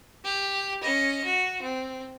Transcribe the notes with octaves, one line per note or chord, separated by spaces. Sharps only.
G4
C#4 D#5
F#4
C4